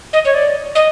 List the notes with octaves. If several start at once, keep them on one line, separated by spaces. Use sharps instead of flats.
D#5
C#5
D5
D#5